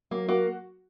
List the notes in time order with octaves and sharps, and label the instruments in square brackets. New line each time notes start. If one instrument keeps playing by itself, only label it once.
[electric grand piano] F#3 [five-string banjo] A#3
[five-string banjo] A#3 [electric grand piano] F#4